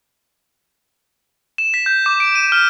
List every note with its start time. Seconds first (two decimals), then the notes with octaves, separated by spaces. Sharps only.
1.58 E7
1.74 B6
1.86 G6
2.06 D6
2.20 D7
2.35 D#7
2.52 F6